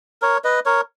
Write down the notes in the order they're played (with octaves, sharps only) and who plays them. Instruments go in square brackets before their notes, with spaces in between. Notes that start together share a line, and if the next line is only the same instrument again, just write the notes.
[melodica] A#4 C#5
B4 D#5
A#4 C#5